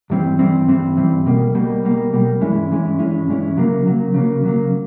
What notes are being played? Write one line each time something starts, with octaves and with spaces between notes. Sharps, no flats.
G2 E3 G3 C4
G2 E3 G3 C4
G2 E3 G3 C4
G2 E3 G3 C4
B1 B2 G3 A#3
B1 B2 G3 A#3
B1 B2 G3 A#3
B1 B2 G3 A#3
G2 E3 G#3 C#4 E4
G2 E3 G#3 C#4 E4
G2 E3 G#3 C#4 E4
G2 E3 G#3 C#4 E4
C#3 F#3 A#3
C#3 F#3 A#3
C#3 F#3 A#3
C#3 F#3 A#3